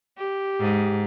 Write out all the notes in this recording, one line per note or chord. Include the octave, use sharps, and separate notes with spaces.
G4
G#2